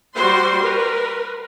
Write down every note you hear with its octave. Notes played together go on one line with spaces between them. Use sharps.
G3 F#4 C5 C6
A#4 B4